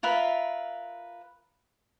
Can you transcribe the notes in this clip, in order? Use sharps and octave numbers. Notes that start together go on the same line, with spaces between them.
F4 A#4 B4 E5